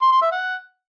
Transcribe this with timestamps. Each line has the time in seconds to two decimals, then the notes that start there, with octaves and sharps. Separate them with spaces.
0.02 C6
0.12 C6
0.22 E5
0.32 F#5